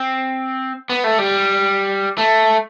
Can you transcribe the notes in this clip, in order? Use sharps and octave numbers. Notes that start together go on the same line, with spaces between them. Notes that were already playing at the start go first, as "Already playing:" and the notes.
Already playing: C4
B3
A3
G3
A3